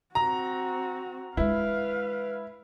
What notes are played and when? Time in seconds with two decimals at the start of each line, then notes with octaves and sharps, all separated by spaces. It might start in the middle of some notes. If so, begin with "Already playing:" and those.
0.15 C4 F#4 A#5
1.37 G#3 D4 E4 B4 F5